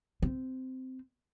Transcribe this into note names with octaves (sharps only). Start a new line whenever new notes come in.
C4